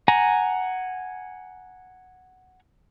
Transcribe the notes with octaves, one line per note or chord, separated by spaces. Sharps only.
F#5 G#5 A#5